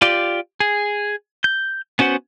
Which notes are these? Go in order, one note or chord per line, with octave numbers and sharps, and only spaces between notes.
F4 G4 D5
G#4
G6
B3 C#4 F#4 C5 F#5